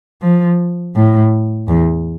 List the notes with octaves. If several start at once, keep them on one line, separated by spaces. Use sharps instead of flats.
F3
A2
E2